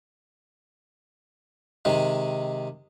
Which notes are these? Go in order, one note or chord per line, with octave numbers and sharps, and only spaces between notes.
C3 D#3 G#3